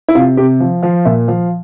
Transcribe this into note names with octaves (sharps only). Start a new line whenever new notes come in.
E4
C3 F4
C3 G4
F3
F3 F5
A#2 E5
F3 F5